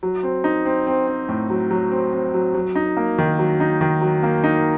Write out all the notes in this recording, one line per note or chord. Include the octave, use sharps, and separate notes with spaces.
F#3
C4
D#4
C4
C4
C4
A2
F#3
F#3
C4
C4
F#3
F#3
D#4
A#3
D#3
F#3
D#4
D#3
F#3
A#3
D#4